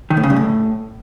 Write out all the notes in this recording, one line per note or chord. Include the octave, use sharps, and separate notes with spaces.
D#3
A2
C#3
G2
A2